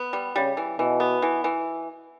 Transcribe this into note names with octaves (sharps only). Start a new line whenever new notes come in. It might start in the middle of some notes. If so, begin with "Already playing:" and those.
Already playing: B3
G3
C#3 G3
E3
B2 E3
B3
E3
E3